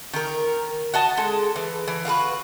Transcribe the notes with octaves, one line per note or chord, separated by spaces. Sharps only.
D#3 A#4
F#4 D#5 A5
G#3 A4
E3
E3
F4 F#4 A4 B4